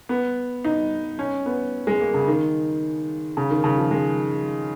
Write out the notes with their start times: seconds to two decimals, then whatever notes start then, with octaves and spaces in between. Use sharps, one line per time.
0.09 B3
0.64 D#4
1.19 C#4
1.46 B3
1.87 G#3
2.00 A#3
2.14 C#3
2.27 D#3
3.37 C#3
3.50 D#3
3.64 C#3
3.78 F3
3.91 G#3